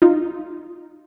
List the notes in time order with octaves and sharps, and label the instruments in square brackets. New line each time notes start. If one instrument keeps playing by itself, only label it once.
[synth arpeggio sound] D#4 F4